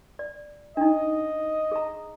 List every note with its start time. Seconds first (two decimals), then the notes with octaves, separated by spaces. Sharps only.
0.19 D5
0.77 D4 D#4 D#5
1.72 G#4 A#5